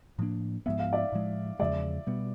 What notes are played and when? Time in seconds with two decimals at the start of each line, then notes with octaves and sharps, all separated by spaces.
0.19 A2 F3 A#3 D4
0.66 G#2 F3 G#3 B3 E5
0.79 F5
0.93 D5 E5
1.12 A2 F3 G#3
1.59 E2 C#3 F3 G#3 D5 E5
2.07 B2 G3 B3